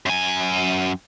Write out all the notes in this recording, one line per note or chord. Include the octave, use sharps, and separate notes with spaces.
F#2 G#5